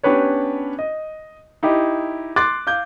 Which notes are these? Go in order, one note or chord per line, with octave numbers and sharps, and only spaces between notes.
B3 C#4 D4 G4 B4 C#5
D#5
D#4 E4 G4
C6 D6 F#6 A6
F5 D6 G6